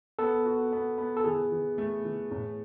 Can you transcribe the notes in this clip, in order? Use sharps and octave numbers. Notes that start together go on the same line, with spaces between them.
B3 A4
F#4
B3
B3
A4
E3 G#4
E3
A3
E3
A2